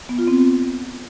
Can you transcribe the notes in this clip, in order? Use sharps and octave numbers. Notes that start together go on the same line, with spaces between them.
B3
F4
C4